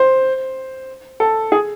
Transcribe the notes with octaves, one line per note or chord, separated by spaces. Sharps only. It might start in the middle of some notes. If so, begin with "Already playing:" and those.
Already playing: C5
A4
G#4